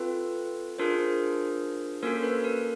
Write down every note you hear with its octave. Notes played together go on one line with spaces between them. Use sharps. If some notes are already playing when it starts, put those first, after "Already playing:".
Already playing: C4 F4 A4 B4
D4 F4 G#4 A#4 C5
A#3 C#4 F#4 A4 A#4 C5
A4 B4
A#4